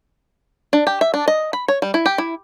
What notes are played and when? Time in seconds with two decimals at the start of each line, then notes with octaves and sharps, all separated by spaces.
0.73 D4
0.87 G4
1.01 E5
1.14 D4
1.28 D#5
1.53 B5
1.68 C#5
1.82 G3
1.94 E4
2.06 G4
2.18 E4